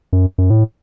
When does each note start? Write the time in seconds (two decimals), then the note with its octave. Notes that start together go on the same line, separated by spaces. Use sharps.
0.13 F#2
0.38 F#2
0.50 A2